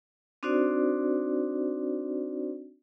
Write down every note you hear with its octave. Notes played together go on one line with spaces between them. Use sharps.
C4 D4 D#4 F#4 C5 D5